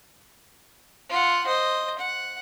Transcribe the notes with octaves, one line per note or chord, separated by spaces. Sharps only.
F4 F#5
C5 D#5
F#5